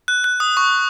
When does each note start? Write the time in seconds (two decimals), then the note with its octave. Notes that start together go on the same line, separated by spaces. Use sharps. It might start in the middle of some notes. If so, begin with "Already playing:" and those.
0.08 F#6
0.24 F#6
0.40 D#6
0.57 C#6